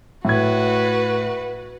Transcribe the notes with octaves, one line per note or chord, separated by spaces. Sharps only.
A2 F#4 B4 G#6